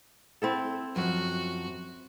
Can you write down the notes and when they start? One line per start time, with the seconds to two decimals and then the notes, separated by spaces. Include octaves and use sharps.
0.42 C4 E4 A4
0.96 F#2 F3 F#4